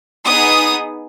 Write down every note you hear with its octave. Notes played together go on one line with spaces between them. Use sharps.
B3 D#4 G#4 D#6